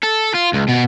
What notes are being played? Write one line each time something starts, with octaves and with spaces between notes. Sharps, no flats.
A4
F4
C#2
B2